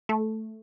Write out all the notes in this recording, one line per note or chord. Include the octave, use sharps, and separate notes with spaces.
A3